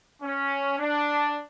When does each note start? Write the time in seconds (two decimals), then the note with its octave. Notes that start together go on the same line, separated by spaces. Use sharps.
0.22 C#4
0.79 D4